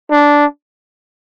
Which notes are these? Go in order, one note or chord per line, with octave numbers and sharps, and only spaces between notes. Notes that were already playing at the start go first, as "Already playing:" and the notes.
D4